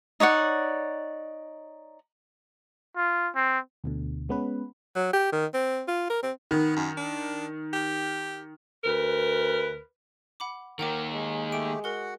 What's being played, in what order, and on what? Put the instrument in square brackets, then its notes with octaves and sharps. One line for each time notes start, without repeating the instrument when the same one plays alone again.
[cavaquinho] D#4 C#5 D5 F#5
[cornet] F4
C4
[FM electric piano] D2 B2 D3
G#3 B3 C#4 B4
[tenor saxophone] F#3
G4
D#3
C4
F4
A#4
C4
[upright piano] D#3 [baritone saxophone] B3
[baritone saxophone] F#2
D4
G4
[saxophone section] D2 A#4 B4
[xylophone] F#5 B5 D6
[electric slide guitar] D#3 A#3 [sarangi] A#4 [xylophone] F#5 G5 D6
[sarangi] G#3
[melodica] A3 G4 [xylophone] D7
[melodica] F#4 F#5 [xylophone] A#4 G7